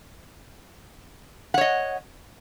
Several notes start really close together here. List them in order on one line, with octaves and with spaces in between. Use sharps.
F#5 C#5 D#5